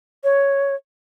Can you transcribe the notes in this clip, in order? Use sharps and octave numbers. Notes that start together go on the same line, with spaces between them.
C#5